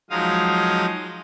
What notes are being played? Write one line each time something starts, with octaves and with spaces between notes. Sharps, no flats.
F3 F#3 G#3 D#4 F5 D#6